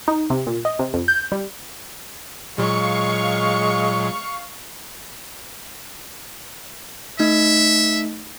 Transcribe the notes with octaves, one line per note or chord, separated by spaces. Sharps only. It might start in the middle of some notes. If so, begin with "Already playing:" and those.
D#4
C3
A#2
D#5
C3
F2
G6
G3
A#2 F#3 G#3 F5 C#6
A3 D#4 E5